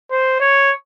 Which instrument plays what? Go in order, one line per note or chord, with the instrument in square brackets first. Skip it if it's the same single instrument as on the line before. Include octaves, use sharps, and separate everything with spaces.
[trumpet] C5
C#5